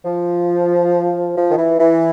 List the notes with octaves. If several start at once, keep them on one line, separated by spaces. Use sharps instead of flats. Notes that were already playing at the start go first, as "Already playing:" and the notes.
F3
F3
D#3
E3
E3